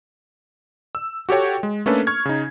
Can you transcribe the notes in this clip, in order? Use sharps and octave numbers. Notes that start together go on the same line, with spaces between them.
E6
F#4 G4 A4 C#5 G5
G#3
A3 A#3 C#4 D4 A4 B4
C#6 F6 G#6
C#3 D#4